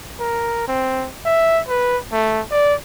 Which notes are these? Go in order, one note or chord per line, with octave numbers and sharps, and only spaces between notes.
A#4
C4
E5
B4
A3
D5